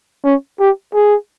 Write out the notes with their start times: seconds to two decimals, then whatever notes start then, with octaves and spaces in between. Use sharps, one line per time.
0.25 C#4
0.60 G4
0.94 G#4